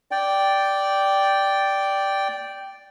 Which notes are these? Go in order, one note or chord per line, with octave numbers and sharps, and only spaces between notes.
D5 G5